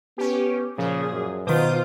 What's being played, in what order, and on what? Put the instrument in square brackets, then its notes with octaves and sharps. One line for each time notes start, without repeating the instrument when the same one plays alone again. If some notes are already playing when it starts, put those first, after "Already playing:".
[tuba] B3 [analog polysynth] C#4 G4
[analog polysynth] A#2 F3 [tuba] C#3 [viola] G#4
[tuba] F#2
[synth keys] B2 D#3 [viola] F4 C5 [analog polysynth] D6 D#6 G6